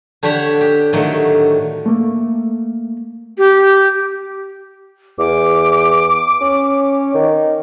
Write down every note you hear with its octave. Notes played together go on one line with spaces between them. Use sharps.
D3 D4 G4 C#5 F#5 B5
G4
A2 D3 D#3 F#3
A3 A#3
G4
E2 D6
C#4
D#3